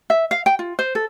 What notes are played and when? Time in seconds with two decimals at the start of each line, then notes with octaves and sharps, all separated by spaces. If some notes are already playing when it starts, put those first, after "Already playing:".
0.10 E5
0.31 F5
0.46 G5
0.59 F4
0.79 C5
0.95 A4